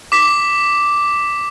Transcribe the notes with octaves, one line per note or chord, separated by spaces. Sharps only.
D6 B6